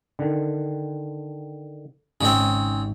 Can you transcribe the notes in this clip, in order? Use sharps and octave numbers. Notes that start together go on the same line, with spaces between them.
D3 D#3
G#1 C#3 C4 D#5